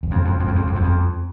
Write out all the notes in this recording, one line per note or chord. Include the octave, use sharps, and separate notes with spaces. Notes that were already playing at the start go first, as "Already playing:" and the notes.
E2
F2
F2
F2
E2
F2
F2
E2
F2